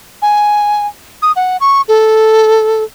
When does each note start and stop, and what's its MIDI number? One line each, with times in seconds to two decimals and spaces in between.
0.22 0.87 80
1.22 1.32 87
1.36 1.57 78
1.60 1.82 85
1.88 2.84 69